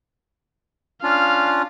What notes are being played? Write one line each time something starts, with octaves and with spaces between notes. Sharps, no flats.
C#4 D4 F4 F5